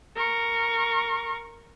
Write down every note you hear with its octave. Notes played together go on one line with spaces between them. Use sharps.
A#4 C#6